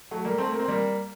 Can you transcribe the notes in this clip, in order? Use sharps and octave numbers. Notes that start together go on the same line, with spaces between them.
F#3 A3
G3 A#3
A3 C4
A#3
C4
G3 A#3